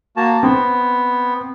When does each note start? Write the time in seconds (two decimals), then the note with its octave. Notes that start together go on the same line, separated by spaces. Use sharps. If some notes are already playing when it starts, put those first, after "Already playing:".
0.17 A#3 F#4 A5
0.43 B3 C4